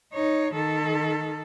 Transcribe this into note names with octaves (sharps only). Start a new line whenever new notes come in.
D#4 C#5
D#3 A4